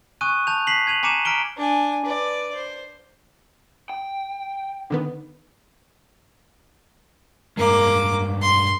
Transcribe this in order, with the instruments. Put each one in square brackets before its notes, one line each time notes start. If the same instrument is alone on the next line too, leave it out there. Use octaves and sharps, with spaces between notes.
[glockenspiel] G#5 C#6 D#6 F#6 D#7
A5 G6 F7
B6 C7 F#7
G#6 D#7 F7 F#7
G#5 A#5 D6 C#7 D#7 E7
A#5 F6 B6 D7 G7
[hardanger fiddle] D4 G#5
B4 D5
C5
[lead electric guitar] G5
[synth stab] D3 D#3 B3
[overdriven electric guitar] G2 G#3 [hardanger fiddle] A#3 D6
[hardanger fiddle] C6